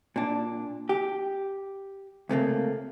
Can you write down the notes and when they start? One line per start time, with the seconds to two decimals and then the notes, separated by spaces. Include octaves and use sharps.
0.16 A#2 D4
0.89 G4
2.29 C#2 C3 A3 A#3